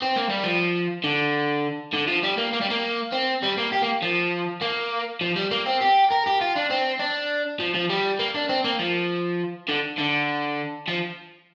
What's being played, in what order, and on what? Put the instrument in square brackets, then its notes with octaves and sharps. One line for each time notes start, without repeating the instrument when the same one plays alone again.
[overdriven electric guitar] C4
A#3
G3
F3
D3
D3
F3
G3
A#3
A#3
G3
A#3
C4
G3
A#3
G4
A#3
F3
A#3
F3
G3
A#3
C4
G4
A#4
G4
F4
D4
C4
D4
F3
F3
G3
A#3
D4
C4
A#3
F3
D3
D3
F3